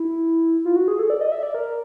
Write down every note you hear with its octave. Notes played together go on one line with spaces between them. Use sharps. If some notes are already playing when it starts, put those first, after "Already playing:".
Already playing: E4
F4
F#4
G#4
A4
D5
D#5
E5
D5
A#4